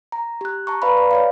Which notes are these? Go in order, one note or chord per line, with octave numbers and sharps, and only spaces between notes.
A#5
G4 F#6
A5 A#5 C#6
B4 D5 F5 A#5 B5
D5
C#5 D5 F5